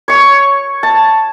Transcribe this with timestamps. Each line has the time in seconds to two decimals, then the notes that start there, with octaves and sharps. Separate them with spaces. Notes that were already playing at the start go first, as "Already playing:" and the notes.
0.08 C#5 C#6
0.83 A5